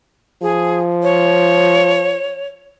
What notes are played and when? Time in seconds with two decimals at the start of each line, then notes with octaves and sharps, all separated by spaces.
0.42 F3 G#4
1.03 C#5